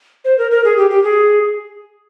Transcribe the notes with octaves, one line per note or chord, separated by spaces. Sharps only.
C5
A#4
A#4
G#4
G4
G4
G#4